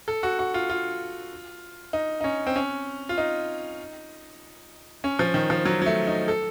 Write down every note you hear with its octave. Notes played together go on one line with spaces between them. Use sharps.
A4
F#4
F#4
F4
F4
D#4
D#4
C#4
C4
C#4
F4
D#4
C#4
F3
D#3
F3
F#3
F#3
A3
D#4
A4